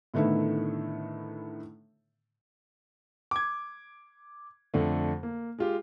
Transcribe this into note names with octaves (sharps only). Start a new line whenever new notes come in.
A2 D3 D#3 A3 B3 E4
D6 G#6
F2 D3 A3
A#3
G#3 F4 G4